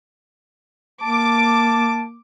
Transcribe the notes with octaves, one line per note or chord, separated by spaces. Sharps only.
A#3 A5 D6